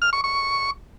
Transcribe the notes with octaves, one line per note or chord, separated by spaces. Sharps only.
F6
C#6
C#6